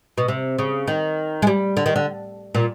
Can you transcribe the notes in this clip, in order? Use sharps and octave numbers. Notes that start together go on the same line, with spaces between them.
B2
C3
C#3
D#3
G#3
G3
D3
D#3
D3
A#2